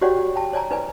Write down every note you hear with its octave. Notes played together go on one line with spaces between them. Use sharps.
F#4 G4 C#5 D5 F#5 G5
F#4
G5 A5
C#5 D5 G#5 A#5
D#4 B4 D5 G#5